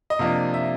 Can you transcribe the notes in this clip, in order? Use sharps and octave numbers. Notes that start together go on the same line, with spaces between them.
D#5
C3 F3 A#3 D4
E5